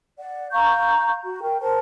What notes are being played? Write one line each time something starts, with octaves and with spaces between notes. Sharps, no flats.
D5 F#5
F5 A#5 C#6 G6
F#4
A#4 G5
A#4 C5 A5